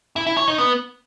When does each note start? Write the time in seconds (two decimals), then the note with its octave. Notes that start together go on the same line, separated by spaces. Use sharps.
0.16 E4
0.27 E4
0.37 C#5
0.48 D#4
0.58 B3